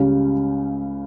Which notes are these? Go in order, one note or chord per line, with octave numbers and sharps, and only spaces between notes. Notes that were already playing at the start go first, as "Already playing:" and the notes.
Already playing: C#2 C#3 G3 C#4